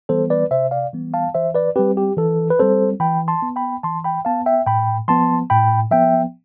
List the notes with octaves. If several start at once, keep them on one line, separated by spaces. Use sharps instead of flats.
E3 G3 B3 A4 C5
B4 D5
C3 C5 E5
D5 F5
E3 G3 B3
F5 A5
E3 C5 E5
B4 D5
G3 C4 G4 B4
G4
E3 A4
B4
G3 C4 A4 C5
E3 G5 B5
A5 C6
B3
G5 B5
E3 A5 C6
G5 B5
B3 F5 A5
E5 G5
A2 G5 B5
F3 B3 A5 C6
A2 G5 B5
F3 B3 E5 G5